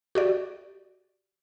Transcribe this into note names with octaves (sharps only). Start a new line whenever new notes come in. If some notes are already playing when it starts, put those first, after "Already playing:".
F#4 G4 D5